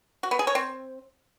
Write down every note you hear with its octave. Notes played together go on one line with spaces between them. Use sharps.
F#4
B3
G#4
C#5
C4